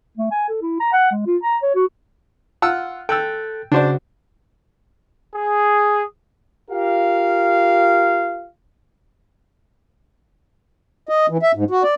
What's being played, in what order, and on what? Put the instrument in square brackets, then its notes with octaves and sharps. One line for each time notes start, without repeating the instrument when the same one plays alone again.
[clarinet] A3
G#5
A4
E4
A#5
F#5
G#3
F4
A#5
C#5
F#4
[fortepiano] F4 F#5 E6
[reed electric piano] A4 F#6 A6 [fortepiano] G5 E6
[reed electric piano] C#3 F#4 [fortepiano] D4 C5 D5
[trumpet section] G#4
[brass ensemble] F4 G4 A#4 F5
[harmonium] D#5
E3
E5
G#2
F#4
D5